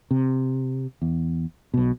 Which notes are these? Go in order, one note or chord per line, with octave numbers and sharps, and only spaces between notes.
C3
E2
B1 B2